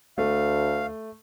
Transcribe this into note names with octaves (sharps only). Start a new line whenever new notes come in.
D2 A3 F5